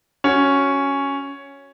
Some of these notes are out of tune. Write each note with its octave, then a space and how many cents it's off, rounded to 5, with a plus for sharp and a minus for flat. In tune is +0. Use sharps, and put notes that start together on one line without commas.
C#4 +0 F#4 +5